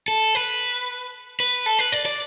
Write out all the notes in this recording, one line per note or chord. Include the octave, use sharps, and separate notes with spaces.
A4
B4
B4
A4
B4
D5
D5